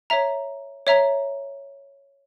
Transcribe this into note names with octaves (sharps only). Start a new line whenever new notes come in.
C#5 E5 A#5
C#5 E5 A#5